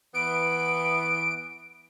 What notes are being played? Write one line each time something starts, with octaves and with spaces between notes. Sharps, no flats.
E3 B3 D7